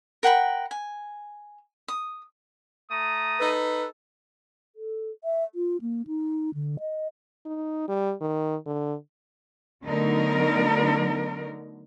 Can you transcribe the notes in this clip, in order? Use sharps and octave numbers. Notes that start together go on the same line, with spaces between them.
A#4 F#5 G5 B5
G#5
D#6
A3 A#5 D#6
D#4 A4 B4
A4
E5
F4
A#3
D#4
D3
D#5
D#4
G3
D#3
D3
D3 F#3 A3 B3 D#4 A#4